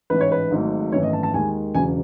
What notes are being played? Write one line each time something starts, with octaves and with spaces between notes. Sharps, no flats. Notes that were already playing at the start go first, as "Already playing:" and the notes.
A1 G#2 E3 B4
C#5
B4
G#1 G#2 F#3 A3
G#1 F#2 E3 A3 C#5
D#5
A5
A5
D#2 D#3 G#3 G#5
E1 E2 C#3 F#3 G#5